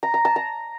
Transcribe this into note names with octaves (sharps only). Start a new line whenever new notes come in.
A#5
A#5
A5
A#5